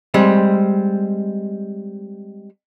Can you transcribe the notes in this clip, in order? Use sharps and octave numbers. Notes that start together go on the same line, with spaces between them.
G3 G#3 C4